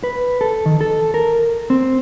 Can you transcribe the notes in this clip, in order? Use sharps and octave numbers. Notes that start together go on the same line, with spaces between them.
B4
A4
D#3
A4
A#4
C4